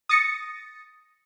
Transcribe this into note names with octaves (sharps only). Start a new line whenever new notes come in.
D#6 A6 A#6 C#7